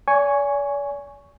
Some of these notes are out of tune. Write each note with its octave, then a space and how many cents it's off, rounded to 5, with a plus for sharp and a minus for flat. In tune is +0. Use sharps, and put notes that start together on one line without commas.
D5 -45 G#5 +0 C#6 +0